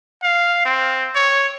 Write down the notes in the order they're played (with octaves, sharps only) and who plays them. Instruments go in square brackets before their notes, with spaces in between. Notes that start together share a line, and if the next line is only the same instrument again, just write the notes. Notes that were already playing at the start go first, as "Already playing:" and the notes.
[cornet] F5
C4
C#5